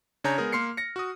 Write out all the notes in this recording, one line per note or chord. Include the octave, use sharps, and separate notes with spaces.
C#3 D4 C#5 G#5 A#5 G6
G#3 B3 G#4 A#4
A#3 C6 F6 C7 C#7
A#6 C#7
F#4 D#6